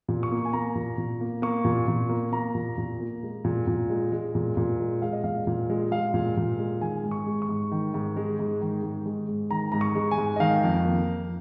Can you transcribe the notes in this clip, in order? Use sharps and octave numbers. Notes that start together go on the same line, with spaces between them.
A#2
C#6
A#3
G#5
A#3 A#5
A#2
A#2
A#3
A#3 C#6
A#2
A#2
A#3
A#3 A#5
A#2
A#2
A#3
G#3
A#2
A#2
G#3
G#3
A#2
A#2
G#3
G#3 F5
D#5
A#2 F5
A#2
G#3
G#3 F5
A#2
A#2
G#3
D#3 G#5
G#2
C#6
G#3
C#6
G#2
D#3
G#2
G#3
G#2
D#3
G#2
G#3
G#2
D#3 A#5
G#2 A#5
C#6
G#3
G#5
G#2
D#5
D#3 F5
F2
A#3
F2